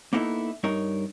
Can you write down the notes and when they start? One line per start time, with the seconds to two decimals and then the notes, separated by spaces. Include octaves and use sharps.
0.13 A#3 B3 D#4 E4 A4
0.64 G2 D#4 A#4 C#5